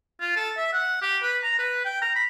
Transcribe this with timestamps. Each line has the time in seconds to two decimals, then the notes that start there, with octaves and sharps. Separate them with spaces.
0.20 F4
0.36 A4
0.57 E5
0.73 F#5
1.02 G4
1.23 B4
1.43 A#5
1.59 B4
1.85 G5
2.02 A#5
2.16 B5